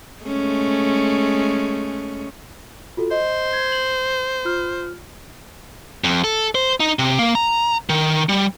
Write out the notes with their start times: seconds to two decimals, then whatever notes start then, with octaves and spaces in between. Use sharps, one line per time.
0.23 G#3 A3 C#4
2.97 F4 F#4 A4
3.11 C5 D#5
3.53 G#6
3.72 F#7
4.45 F4 F6
6.04 F2
6.24 A4
6.55 C5
6.80 D#4
6.99 C3
7.19 A#3
7.35 A#5
7.89 D#3
8.29 G3